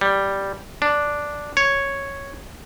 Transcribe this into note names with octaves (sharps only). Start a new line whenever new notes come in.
G3
D4
C#5